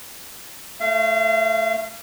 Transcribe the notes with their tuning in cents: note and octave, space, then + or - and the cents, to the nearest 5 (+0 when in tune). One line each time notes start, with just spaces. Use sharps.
A3 +0 F5 -35